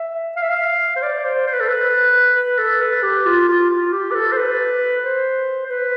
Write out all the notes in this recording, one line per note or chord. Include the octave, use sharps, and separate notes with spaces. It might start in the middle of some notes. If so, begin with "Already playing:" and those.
Already playing: E5
F5
E5
F5
C5
D5
C5
C5
B4
A4
B4
B4
A4
B4
G4
F4
F4
F4
G4
B4
A4
C5
B4
C5
C5
B4